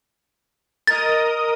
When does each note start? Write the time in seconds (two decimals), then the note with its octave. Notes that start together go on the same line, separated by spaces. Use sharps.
0.87 A#4 D#5 D#6 A6